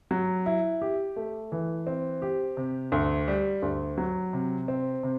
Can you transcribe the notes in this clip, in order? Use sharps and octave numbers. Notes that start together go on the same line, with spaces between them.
F#3
E4
G4
A3
E3
C4
G4
C3
D2
G3
D2
F#3
C3
C4
C3